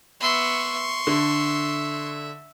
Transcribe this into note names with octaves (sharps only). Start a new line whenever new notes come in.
B3 E5 C6 C#6
D3 E5